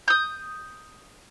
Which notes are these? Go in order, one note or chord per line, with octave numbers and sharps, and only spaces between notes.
D#6 G6